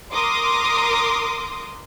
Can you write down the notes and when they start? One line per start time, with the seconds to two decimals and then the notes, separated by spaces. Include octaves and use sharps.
0.12 A#4 C6 D6 D#6